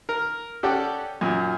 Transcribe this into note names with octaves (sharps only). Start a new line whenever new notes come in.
A#4
C#4 G4 A4 D5 F#5 G5
F#2 A#2